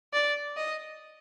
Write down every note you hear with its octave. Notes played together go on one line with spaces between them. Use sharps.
D5
D#5